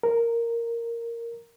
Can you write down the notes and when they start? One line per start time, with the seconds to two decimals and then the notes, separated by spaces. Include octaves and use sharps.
0.03 A#4